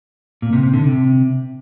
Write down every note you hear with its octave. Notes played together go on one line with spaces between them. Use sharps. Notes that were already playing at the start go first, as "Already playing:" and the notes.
A#2
C3
C3
D3
C3